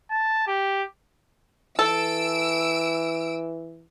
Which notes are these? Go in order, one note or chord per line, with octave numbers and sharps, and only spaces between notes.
A5
G4
E3 A4 E6 D7